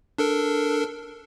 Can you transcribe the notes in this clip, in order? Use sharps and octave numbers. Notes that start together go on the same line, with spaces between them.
D4 A4 A#4